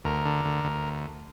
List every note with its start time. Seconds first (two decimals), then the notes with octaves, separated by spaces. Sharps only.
0.04 D2 A#4
0.25 D3
0.45 D2
0.64 D2